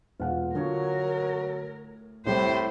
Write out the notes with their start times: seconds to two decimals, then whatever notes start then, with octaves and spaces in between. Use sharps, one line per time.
0.20 E1 A#2 F4 F#5
0.55 A#2 D3 F#3 G#4 A#4 C#5
1.17 A2
2.26 C2 A2 G3 E4 C5